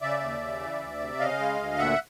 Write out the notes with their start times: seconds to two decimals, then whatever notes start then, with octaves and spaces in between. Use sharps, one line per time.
0.02 C#3 D5 E5
0.21 D#2
0.41 C#3
0.61 E3
0.81 D2
1.00 C3
1.19 C#3 D#5 F5
1.39 G#3
1.59 D2
1.78 A#2 E5 F#5